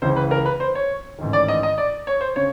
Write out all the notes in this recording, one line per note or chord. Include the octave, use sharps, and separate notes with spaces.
C#2 C#3 E3 C5
B4
A#4
B4
C5
C#5
A1 G#2 D#3
D5
D#5
D#5
D5
C#5
C5
C#3 C#5